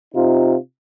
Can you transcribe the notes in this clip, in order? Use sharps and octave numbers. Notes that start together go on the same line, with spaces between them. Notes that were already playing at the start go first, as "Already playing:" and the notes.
C3 D#4 F4